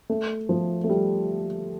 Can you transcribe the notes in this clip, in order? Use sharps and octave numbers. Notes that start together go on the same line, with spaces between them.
A3
F3
A3
G3